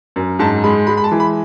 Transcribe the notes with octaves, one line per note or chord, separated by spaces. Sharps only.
F#2
G#2 A5
G#3 B5
G#3 B5
B5
A5
E3
B5